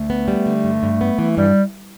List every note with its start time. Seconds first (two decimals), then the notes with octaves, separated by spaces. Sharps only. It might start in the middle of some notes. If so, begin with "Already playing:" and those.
Already playing: D2 A3
0.10 B3
0.28 G3
0.46 D3
0.64 G2
0.83 G2
1.01 B3
1.18 E3
1.37 G2 G3